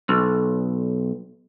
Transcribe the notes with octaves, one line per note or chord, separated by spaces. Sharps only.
B1